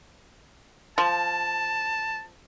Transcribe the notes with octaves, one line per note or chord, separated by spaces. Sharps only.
F3 A5